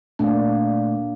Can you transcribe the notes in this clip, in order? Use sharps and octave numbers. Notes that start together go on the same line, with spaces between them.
A#2 A3 A#3 D4